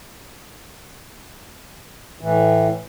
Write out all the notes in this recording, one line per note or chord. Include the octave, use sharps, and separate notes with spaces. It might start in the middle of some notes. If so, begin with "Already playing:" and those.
A2 E3